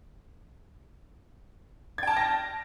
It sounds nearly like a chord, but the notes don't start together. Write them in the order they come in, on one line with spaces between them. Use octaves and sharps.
G#6 G5 A5 F6 A#6